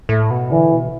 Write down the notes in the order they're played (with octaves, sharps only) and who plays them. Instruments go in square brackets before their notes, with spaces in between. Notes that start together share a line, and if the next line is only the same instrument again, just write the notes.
[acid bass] A2 [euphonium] A3
[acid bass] B2
[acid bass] D3 [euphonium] E3
[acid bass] B2